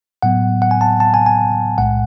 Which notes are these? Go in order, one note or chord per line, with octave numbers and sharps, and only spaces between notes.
A2 F#3 B3 F#5
F#5
G#5
A5
A5
G#5
G#5
B1 A2 G#3 F#5